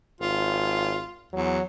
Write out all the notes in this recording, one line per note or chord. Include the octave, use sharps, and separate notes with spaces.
G#1 F4
E2 F#3